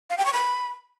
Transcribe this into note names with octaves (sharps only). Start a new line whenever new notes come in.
F5
G5
C#6
B5